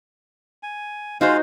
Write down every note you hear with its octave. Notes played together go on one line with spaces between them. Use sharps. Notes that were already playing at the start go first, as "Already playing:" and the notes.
G#5
G#3 D#4 F4 F#4 C5 F5